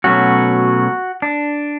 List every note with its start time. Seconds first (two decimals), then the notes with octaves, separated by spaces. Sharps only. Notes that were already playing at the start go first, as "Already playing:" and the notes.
0.04 B2 F#3 A3 C#4 F#4
1.22 D4